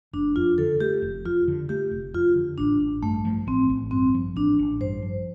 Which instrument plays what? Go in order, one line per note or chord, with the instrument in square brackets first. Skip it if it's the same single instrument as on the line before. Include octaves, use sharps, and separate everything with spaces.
[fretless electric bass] F1 [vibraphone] D4
[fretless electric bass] F2 [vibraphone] F4
[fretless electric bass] D3 [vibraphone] A4
[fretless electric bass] A3 [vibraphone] G4
[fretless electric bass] F1
[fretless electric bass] F2 [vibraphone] F4
[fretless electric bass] D3
[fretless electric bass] A3 [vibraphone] G4
[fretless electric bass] F1
[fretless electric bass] F2 [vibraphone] F4
[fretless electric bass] D3
[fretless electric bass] A1 [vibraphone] D4
[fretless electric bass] A1
[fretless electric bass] G2 [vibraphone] A3
[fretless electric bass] F3
[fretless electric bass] A1 [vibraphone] C4
[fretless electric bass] A1
[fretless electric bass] G2 [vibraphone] C4
[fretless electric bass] F3
[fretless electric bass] A1 [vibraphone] D4
[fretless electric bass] A1
[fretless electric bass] G2 [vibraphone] C5
[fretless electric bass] F3